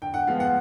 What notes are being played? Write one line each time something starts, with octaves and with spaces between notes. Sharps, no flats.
D3 G5
F#5
F3 G#3 B3 F5
F#5